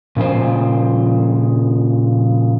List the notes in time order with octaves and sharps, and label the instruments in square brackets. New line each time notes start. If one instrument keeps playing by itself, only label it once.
[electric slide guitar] A#2 C#3 F3 C5